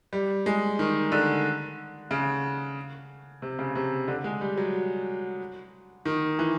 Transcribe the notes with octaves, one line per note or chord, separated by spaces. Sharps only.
G3
G#3
D#3
D3
C#3
C3
C#3
C3
D3
G#3
G3
F#3
D#3
E3